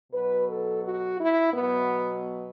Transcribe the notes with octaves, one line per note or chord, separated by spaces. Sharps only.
B2 F#3 B4
A4
F#4
E4
B2 F#3 B3